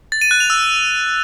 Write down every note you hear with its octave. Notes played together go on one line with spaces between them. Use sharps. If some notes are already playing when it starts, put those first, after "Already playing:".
A6
D#7
F#6
F7
E6